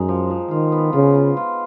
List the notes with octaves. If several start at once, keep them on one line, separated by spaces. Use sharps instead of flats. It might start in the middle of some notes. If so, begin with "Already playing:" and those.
Already playing: F#2 G#3 D#4
F3
F3
D#3 F4
B3
C#3 F4
F4
F4